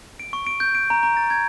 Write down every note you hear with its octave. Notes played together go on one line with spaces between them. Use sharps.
D7
C#6
D7
G6
D7
A#5
A#5
A6
G#6